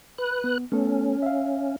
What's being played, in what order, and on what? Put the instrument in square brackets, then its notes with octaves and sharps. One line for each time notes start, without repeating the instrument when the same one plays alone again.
[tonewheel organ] B4 F#6
[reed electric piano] B3
[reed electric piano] A3 B3 A4 [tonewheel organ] C#4
[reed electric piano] E5 F5